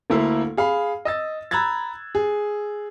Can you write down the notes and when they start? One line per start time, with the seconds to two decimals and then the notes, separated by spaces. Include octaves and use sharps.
0.10 D2 A3 A#3 E4 F5
0.57 G#4 F5 B5
1.05 D#5 E6 A6
1.51 A#5 B5 E6 F#6 G#6 A6
2.15 G#4